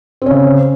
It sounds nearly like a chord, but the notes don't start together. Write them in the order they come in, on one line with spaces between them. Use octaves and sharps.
C4 C#4 C#3